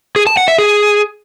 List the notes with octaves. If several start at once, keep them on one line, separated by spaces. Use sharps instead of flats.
G#4
A5
F#5
E5
G#4